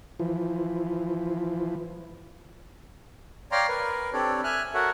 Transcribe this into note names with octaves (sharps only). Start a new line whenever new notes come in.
E3 F3
C#5 D5 F5 G5 A#5 C6
A#4 B4
C4 D4 G4 A4 C#5 D5
E5 G#5 F6 F#6
F#4 A4 A#4 C#5 E5 F#5